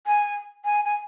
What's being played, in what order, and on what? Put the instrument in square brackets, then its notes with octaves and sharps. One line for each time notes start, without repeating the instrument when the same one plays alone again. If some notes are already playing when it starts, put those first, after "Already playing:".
[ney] G#5
G#5
G#5